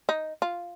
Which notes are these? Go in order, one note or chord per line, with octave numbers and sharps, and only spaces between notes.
D#4
F4